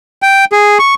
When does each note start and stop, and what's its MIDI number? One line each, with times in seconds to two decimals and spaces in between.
0.22 0.45 79
0.52 0.78 68
0.79 0.95 85